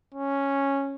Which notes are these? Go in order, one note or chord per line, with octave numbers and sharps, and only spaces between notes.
C#4